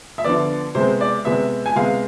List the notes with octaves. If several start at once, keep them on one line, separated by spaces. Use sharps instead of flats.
E5
D3 F3 B3 D5
C3 G#3 B3 C5
D5
C3 G#3 B3 E5
G#5
C3 G#3 B3 F5